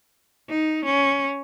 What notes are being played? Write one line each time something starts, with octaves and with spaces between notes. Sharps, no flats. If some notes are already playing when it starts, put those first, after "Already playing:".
D#4
C#4